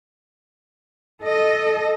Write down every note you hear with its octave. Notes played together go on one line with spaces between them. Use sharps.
A4 D#5